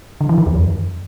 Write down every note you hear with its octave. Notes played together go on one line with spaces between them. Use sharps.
D3
E3
D#3
E2
F#2